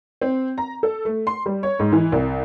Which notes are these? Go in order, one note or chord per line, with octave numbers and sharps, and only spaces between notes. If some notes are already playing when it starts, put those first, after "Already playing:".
C4
A#5
A4
A3
C6
G3
C#5
G#2
E3
C2